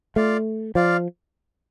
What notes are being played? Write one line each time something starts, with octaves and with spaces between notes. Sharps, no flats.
A3 F4 D5 F5
F3 F4 D5 F5